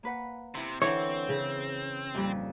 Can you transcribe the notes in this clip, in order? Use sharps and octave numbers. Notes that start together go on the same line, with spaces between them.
A#3 B4 F#5
C3 E4 C6
D3 E3 C4 C#5
C#3
F2 A#2 G3